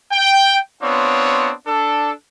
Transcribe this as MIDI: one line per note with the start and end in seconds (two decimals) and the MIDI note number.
0.11 0.58 79
0.81 1.51 59
0.81 1.51 60
0.81 1.51 62
0.81 1.51 65
0.81 1.51 73
1.66 2.11 62
1.66 2.11 69